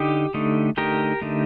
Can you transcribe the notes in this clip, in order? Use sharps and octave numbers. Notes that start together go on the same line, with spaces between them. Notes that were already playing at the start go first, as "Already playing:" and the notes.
Already playing: D3 D#4 G4
D3 A3 D#4
D3 A3 D#4 G4 A#4
D3 A3 D#4